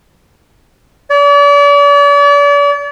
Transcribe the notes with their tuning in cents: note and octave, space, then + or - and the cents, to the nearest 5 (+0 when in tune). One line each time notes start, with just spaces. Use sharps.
D5 -40